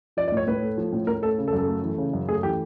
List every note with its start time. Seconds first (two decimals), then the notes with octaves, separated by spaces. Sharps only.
0.17 F3 D5
0.28 D5
0.32 A2 C#5
0.47 A2 B4
0.62 A3
0.78 F3
0.92 A2
1.07 A2 A#4
1.22 A3 A4
1.38 C#3
1.48 A4
1.53 F#2
1.58 A4
1.68 A3
1.83 E3
1.98 C#3
2.13 F#2
2.29 A3 G#4
2.43 E3 G4